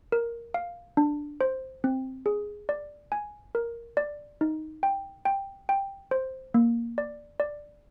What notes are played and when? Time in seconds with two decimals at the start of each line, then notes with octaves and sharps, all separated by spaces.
0.12 A#4
0.54 F5
0.97 D4
1.41 C5
1.84 C4
2.26 G#4
2.69 D5
3.12 G#5
3.55 A#4
3.97 D5
4.41 D#4
4.83 G5
5.25 G5
5.69 G5
6.11 C5
6.54 A#3
6.98 D5
7.40 D5